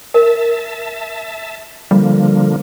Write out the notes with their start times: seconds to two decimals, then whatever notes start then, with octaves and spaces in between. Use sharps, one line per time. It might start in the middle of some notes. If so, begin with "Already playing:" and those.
0.14 A#4 E5 A5
1.91 D3 F3 G3 A#3